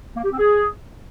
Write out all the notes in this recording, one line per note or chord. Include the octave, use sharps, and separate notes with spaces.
A#3
G4
C4
G#4